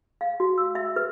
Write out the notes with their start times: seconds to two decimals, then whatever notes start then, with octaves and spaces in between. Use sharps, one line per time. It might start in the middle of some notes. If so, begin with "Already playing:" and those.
0.21 F5
0.40 F#4
0.58 E6
0.75 E5
0.96 B4